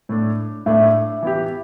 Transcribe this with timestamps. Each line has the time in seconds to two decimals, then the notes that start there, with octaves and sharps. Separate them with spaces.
0.09 A2 A3 D4
0.66 A2 A3 D4 E5
1.23 E3 B3 E4 G4